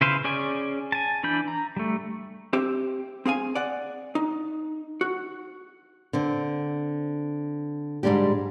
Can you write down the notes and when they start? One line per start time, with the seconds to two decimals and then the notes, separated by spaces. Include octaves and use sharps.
0.01 C#3 E4 B4 C5 F5
0.24 C#4 G#4 D5 G#5
0.92 G#5 A5
1.23 E3 D4 B5 G6
1.48 A#5
1.76 G3 A3
2.53 C4 G4 E5
3.26 C4 G#4 F5 G#5
3.55 D5 F#5
4.15 D#4
5.01 F#4
6.13 D3 C4
8.03 G#2 G3 G#3 D4 G4